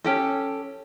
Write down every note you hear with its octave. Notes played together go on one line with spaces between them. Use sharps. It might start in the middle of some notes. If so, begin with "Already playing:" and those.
C#4 G4 A4